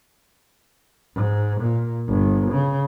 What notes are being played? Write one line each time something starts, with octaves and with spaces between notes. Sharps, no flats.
G#2
A#2
G1
C#3